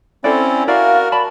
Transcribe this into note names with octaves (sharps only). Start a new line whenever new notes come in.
C4 C#4 E4 A4 C5 D5
E4 F#4 A#4 D5 F5
D5 A5 B5